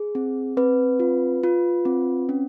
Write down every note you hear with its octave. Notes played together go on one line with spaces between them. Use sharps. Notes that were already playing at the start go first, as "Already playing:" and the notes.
Already playing: G#4
C4
C4 B4
F4
F4
C4
C#4